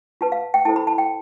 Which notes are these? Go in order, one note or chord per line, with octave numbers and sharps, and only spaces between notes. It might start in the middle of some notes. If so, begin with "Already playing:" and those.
F4 B4 A5
F5
G5
E4 A4 C5 A5
B5
A5
G5